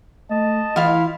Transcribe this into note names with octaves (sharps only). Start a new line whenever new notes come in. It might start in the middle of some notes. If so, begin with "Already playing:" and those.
A3 D#5 A5
E3 E4 F4 F5